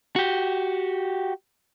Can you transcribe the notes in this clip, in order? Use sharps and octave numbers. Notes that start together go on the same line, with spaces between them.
F#4 G4